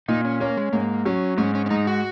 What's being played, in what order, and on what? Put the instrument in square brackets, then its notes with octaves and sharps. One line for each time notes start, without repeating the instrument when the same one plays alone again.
[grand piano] A#2 [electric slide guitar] D#4
[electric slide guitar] C#4
[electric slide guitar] A#3 [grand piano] C#4
[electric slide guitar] G#3
[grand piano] G#2 [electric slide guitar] A#3
[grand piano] F#3 [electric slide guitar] C#4
[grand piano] G#2 [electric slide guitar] C#4
[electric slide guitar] C#4
C#4
[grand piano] G#2 [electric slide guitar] D#4
[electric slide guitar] F#4